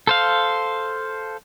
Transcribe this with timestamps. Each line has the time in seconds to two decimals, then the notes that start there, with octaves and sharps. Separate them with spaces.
0.07 A4 C5 F5